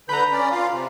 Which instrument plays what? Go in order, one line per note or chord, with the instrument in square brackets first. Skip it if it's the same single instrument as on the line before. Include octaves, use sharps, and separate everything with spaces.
[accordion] D3 B4 G6 [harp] A#5 B5
[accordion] C#4 D5
F4 F5
C3